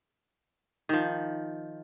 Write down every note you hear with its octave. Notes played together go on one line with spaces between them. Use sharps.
D#3 F3